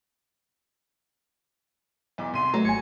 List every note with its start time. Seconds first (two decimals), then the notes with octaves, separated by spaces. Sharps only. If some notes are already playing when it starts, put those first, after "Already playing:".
2.18 B1 E2 D6
2.34 C2 C6 D#7
2.54 F#3 A3 A#5
2.65 G#1 G#5 G#6 C#7